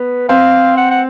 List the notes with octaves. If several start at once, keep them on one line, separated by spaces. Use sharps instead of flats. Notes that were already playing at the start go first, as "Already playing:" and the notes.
Already playing: B3 B4
C4 F5
F#5
F#5